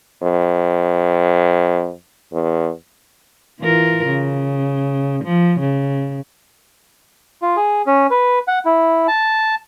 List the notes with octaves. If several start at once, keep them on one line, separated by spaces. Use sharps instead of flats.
F2
E2
E3 F4 A#4
C#3
F3
C#3
F4
G#4
C#4
B4
F#5
E4
A5